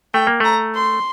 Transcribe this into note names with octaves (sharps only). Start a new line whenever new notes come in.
A3 G5
A#3
A3 A#5
C6